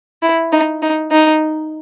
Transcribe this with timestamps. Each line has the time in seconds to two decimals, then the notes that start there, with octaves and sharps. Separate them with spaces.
0.22 E4
0.52 D#4
0.82 D#4
1.11 D#4